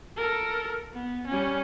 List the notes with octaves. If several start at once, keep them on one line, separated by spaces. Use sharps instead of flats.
A4 A#4
B3
G3 C#4